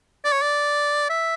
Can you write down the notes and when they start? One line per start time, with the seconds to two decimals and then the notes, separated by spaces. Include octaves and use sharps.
0.24 D5
0.32 C#5
0.42 D5
1.09 E5